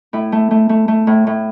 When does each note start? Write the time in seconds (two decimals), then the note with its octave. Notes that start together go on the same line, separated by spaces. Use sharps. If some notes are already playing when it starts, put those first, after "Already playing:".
0.13 A2 E4
0.32 A3
0.51 A3
0.69 A3
0.88 A3
1.07 A2
1.27 A2